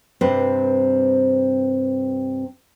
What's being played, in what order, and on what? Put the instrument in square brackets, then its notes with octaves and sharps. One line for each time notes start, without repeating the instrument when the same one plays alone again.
[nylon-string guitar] G2 C3 C4 B4 C5